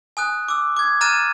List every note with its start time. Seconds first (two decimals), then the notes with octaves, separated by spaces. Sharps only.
0.17 G#5 D#6 F#6
0.48 D6 E6
0.76 D6 G#6
1.01 A#5 F6 F#6 A6 D#7 E7